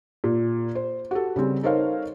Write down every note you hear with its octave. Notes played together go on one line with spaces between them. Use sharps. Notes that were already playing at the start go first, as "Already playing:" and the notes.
A#2
C5
F#4 G4 A4
C#3 G3 C4
D#4 A4 A#4 C5 C#5 F5